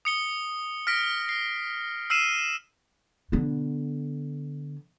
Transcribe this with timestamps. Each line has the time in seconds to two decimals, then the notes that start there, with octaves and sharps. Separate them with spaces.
0.05 D#6 C#7 G7
0.87 F6 A#6 B6 D7
1.29 C7
2.10 E6 F6 C7 D#7 E7
3.32 D3 B3